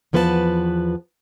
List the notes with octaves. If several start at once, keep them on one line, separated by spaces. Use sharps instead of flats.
E2 F3 B3 B4 C5 A5